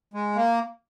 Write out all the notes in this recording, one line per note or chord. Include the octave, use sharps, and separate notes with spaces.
G#3
A#3